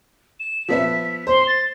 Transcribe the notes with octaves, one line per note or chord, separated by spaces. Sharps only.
E7
F3 B3 E5 B6
C5 C6
A6